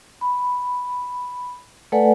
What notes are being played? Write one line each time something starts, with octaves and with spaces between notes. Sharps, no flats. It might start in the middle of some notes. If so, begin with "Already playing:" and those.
B5
A3 A4 B4 D5 F#5 G#5